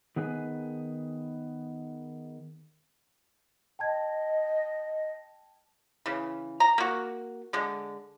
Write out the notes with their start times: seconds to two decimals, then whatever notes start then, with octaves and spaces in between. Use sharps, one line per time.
0.16 D#3 B3 G#4 B4 G#5
3.79 D#5 G5 A5 G#6
6.06 C#3 E3
6.60 A#5
6.78 A#3 F#4
7.53 D3 G#3